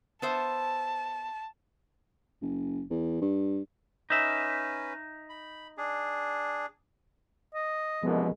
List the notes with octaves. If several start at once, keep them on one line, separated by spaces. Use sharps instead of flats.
B3 C5 E5 A5
F#1
E2
G2
C#4 D#4 B4 E5
B5
D4 G#4
D#5
C2 F#2 B2 F3 G#3 B3